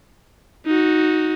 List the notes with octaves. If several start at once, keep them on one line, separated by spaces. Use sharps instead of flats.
D#4 F#4